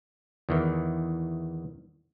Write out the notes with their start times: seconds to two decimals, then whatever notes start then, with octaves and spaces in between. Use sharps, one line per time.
0.49 E2 D#3 E3